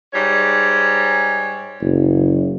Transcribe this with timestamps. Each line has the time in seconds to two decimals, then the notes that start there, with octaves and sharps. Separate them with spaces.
0.13 G#2 G3 C#5
1.82 F#1